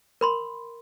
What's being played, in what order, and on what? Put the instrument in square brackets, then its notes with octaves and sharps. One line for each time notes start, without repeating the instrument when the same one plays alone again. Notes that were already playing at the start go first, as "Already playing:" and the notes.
[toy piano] A#4 B5 C6